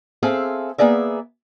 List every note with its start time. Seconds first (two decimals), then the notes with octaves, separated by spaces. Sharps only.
0.23 C4 G#4 A4 E5 F5
0.78 A#3 B3 G#4 D5 E5